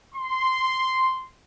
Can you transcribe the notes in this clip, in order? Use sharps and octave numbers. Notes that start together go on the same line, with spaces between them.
C6